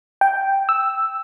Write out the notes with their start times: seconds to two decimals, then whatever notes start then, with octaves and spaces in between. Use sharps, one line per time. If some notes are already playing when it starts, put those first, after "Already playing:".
0.21 G5
0.69 E6